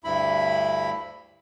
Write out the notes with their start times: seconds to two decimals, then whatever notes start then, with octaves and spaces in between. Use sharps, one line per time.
0.04 D2 G2 E4 B5